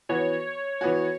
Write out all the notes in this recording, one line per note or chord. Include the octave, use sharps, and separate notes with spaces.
E3 B3 F#4 C#5
E3 B3 F#4